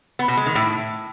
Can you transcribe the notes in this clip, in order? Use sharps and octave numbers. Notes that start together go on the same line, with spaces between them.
B3
B2
G#3
D#3
A2